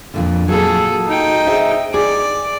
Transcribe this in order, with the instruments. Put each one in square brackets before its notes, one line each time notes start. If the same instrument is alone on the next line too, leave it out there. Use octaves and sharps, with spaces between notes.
[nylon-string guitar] F2 A#2 D3
[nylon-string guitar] A#2 F#3 [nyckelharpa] G#4 A4
[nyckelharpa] D#4 G5
[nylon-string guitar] G#4 C5 E5
[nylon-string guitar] G#4 [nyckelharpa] D5